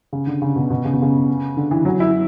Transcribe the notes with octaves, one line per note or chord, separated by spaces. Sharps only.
C#3
D3
C#3
B2
B2
C#3
B2
C#3
D3
E3
F#3
E4